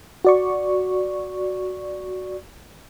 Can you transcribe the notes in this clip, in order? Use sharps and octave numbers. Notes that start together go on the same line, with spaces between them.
F#4 D5 C#6